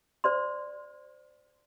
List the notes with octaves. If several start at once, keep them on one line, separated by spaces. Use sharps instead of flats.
C5 D5 C6